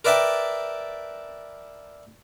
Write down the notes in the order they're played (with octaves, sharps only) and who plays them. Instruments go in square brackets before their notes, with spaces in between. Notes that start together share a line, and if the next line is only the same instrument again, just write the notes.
[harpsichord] A#4 B4 D5 E5 G5 A5